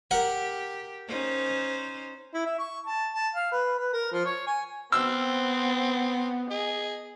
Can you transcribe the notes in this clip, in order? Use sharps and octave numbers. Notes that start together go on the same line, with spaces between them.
G4 A#4 F#5
C#4 D#4 C5
E4
E5
C#6
A5
A5
F5
B4
B4
A#4
F3
C#5
G#5
B3 C4 E6
G#4 D#5